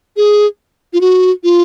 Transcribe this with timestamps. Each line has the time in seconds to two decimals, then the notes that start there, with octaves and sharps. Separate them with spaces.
0.17 G#4
0.93 F4
1.01 F#4
1.44 F4